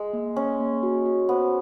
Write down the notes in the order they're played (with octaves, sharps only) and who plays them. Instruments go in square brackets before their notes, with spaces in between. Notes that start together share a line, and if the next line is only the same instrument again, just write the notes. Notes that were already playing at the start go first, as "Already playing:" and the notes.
Already playing: [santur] G#3
[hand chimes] A#3
[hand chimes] A#3 [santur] C#4
[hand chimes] A#3
F#4
F#4
[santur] B3 [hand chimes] C5